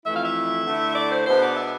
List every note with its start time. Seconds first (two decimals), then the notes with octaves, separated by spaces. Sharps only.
0.05 F2 E3 A3 E4 E5
0.15 F5
0.25 E5
0.65 D3 A3 E4
0.95 D5
1.11 C5
1.26 B2 G#3 B3 D4 C5
1.41 D5
1.57 E5